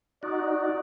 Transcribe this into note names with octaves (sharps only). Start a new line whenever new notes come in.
D#4 F#4 D5